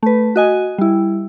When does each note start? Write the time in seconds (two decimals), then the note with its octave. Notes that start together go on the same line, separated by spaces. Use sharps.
0.03 A3 B4
0.36 F#4 D#5 G#5
0.78 G3 E4